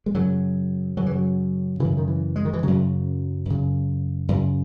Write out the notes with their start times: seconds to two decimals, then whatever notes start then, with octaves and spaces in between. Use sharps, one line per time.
0.06 G#3
0.14 F#2 C#3 F#3
0.97 F#2 C#3 F#3
1.06 E3
1.15 F#3
1.80 F#2 C#3 E3
1.97 D#3
2.08 E3
2.36 G#3
2.45 D#3
2.53 E3
2.63 F#2 C#3 F#3
3.45 F#2 C#3
4.28 F#2 C#3